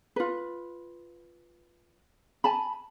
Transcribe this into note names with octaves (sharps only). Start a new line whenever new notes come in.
F4 B4
G#5 A5 B5